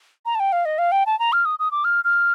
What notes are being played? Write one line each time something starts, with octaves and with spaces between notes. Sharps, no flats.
A#5
A5
G5
F5
D#5
F5
G5
A5
A#5
F6
D#6
D#6
D6
F6
F6